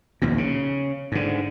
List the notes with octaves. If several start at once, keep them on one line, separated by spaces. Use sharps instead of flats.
A#1 D#2 B2
C#3
G#2 D3